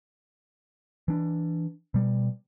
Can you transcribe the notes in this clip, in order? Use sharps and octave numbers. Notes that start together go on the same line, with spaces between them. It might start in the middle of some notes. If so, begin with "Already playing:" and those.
E3 D4
B2 G3